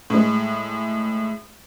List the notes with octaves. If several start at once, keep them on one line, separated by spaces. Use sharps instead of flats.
A2 G#3